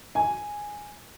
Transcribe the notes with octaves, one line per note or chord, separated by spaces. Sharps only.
G#5